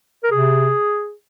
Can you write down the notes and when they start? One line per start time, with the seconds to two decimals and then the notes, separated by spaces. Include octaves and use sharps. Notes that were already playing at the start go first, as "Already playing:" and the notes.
0.24 A#4
0.31 C3 G#4